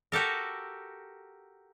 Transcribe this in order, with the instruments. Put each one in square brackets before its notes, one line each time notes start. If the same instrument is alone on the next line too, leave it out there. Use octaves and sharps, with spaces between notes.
[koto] F#4 G4 A4 A#4